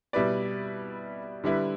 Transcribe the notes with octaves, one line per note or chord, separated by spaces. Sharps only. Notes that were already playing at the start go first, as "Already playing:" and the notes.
B2 G3 E4 B4 D5
D3 G3 E4 B4